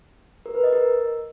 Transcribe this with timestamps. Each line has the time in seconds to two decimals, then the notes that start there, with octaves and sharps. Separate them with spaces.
0.46 A#4
0.55 B4
0.64 D#5
0.73 A#4